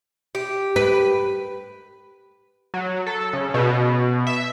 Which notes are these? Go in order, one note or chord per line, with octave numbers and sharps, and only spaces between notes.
G4
B4
F#3
A4
C#3
B2
E5